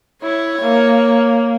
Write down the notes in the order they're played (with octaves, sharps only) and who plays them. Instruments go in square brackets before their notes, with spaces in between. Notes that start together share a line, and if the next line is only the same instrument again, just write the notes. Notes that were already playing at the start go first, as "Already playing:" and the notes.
[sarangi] E4 [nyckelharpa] C#5
[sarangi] A#3